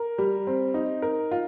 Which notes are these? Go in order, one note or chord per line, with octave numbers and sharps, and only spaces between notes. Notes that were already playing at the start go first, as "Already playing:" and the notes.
Already playing: A#4
G3
C4
D#4
A#4
F4